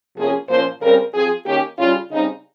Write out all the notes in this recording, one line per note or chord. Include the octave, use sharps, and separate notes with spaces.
C3 F3 A#3 C#4 G#4
A#2 F3 A#3 C#4 C5
C#3 G3 C4 A#4
F3 C4 G#4
D#3 A#3 C#4 G4
C#3 G3 C#4 F4
C#3 G3 C4 D#4